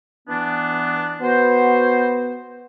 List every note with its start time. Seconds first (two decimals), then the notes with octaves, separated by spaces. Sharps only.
0.28 E3 B3 D4
1.22 B3 F#4 C5